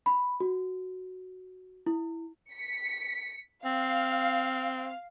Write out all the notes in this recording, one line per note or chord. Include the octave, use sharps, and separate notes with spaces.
B5
F#4
E4
B6 C#7
C4 F5